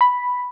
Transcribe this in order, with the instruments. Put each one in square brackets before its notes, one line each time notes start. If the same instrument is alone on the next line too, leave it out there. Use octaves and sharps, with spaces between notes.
[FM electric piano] B5